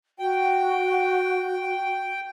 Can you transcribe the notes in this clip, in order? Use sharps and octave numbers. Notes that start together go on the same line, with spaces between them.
F#4 G5